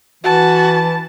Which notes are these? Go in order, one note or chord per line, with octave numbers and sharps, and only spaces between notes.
E3 F#4 A5